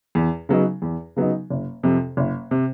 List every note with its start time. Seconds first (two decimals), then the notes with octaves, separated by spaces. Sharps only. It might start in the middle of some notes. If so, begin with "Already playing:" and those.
0.15 E2
0.49 C#3 F#3 B3 D#4
0.82 E2
1.16 C#3 F#3 B3 D#4
1.50 F#1
1.83 F2 C3
2.17 F#1
2.51 C3